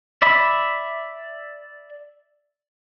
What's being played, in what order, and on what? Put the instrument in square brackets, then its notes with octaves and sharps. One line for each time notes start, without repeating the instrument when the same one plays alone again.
[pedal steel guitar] D5 E5 B5